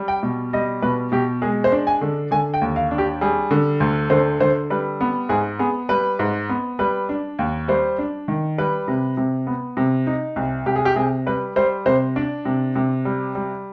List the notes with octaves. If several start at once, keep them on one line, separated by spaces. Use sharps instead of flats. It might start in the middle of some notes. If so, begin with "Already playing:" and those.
Already playing: G3
G5
B2
G3 D#5
B2 B4
B2 G4
G#3 G#4
C5
D4
G#5
D3
D3 G#5
G5
D#2
F5
D4
G4
G3 G#4
D3
D2
D3 C5
D3 C5
G3 B4
B3
G#2 G#4
B3 G#4
G3 B4
G#2
B3
G3 B4
D4
D#2
G3 C5
D4
D#3
G3 B4
C3
C3
B3
C3
D#4
C2
C2 G4
G#4
G4
C3 G#4
G3 B4
G3 C5
C3 C5
D4 D5
C3
C3
G3
G3